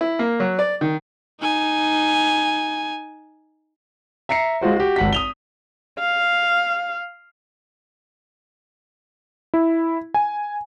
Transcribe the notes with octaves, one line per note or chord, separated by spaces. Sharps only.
E4
A#3
F#3
D5
D#3
D#4 G#5
E5 A#5 C7 C#7
G#3 F4 F#4 C5
F#4 G4
G#1 F#5 B6
D#6 F7 G7
F5
E4
G#5